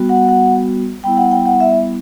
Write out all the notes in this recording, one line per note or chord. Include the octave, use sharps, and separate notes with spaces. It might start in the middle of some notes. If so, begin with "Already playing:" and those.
Already playing: G3 B3 F#4
F#5
F#5
G3 B3 E4 G5
F#5
G5
F#5
E5